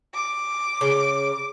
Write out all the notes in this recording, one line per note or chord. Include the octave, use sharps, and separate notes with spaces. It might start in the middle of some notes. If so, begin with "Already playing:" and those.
D6
C#3